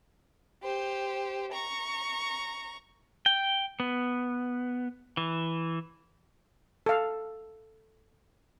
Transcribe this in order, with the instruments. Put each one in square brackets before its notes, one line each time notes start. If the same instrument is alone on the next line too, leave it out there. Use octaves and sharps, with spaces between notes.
[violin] G4 C5
A#5 C#6
[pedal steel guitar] G5
B3
E3
[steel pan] A4 F5